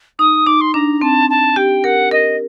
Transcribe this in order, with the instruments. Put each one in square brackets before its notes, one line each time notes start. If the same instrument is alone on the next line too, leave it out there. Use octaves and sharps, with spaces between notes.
[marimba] D#4 [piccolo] D#6
[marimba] D#4 [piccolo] D6
[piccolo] C6
[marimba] D4 [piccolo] A#5
[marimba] C4 [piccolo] A5
[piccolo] A5
[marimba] G4 [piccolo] G5
[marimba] A#4 [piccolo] F#5
[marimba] A#4 [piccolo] D#5